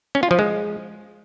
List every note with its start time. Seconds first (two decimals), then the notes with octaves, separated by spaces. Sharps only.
0.15 C#4
0.23 F4
0.31 F3
0.39 G#3